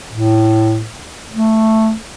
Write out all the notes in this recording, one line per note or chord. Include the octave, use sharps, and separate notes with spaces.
A2
A3